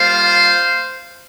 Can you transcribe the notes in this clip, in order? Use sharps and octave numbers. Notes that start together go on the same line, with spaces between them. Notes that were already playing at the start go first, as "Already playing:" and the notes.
Already playing: G3 A#3 F4 C5 F5